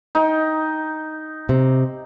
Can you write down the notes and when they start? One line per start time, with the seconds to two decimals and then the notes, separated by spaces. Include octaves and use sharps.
0.15 D#4 G5
1.49 C3